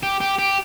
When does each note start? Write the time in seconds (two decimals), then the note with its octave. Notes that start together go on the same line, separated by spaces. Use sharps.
0.03 G4
0.20 G4
0.39 G4